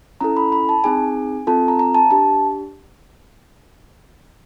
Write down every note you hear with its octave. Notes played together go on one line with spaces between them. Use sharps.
C#4 E4 A4 A#5
B5
B5
A5
C4 D#4 G#4 G#5
C4 F4 A4 A5
A#5
A#5
A5
D4 G4 A5